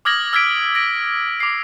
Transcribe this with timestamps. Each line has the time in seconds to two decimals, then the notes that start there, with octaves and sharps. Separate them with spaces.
0.05 D6 D#6 F6 G#6 A#6 F#7
0.33 E6 F6 G#6 A#6 B6 D7
0.75 A#6 D7
1.40 D6 C7